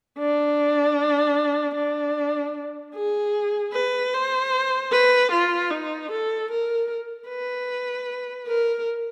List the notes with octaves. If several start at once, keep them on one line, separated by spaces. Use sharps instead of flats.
D4
D4
G#4
B4
C5
B4
F4
D#4
A4
A#4
B4
A#4